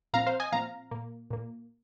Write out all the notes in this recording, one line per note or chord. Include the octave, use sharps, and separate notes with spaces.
A#2 F3 C4 F5 A#5
C5 F5
D#5 G#5
A#2 F3 C4 F5 A#5
A#2 A#3
A#2 A#3